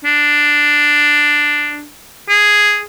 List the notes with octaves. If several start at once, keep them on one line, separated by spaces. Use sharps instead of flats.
D4
G#4